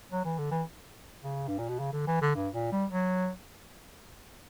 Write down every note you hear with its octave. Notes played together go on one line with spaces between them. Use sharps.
F#3
E3
D3
E3
C#3
G2
A#2
B2
C#3
D3
E3
D3
G2
A#2
G3
F#3